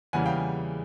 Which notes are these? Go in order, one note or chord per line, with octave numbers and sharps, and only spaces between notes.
E2 C#3 E3 G3 A#3 F#5 G#5
F5 G5